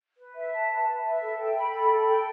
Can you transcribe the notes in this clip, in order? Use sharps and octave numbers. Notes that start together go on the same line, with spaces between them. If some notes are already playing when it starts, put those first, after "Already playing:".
B4
E5
A5
B4
B4
E5
A4
G5
B5
A4
A4
G5